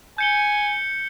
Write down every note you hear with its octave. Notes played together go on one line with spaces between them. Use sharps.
G#5 G6 C#7 G7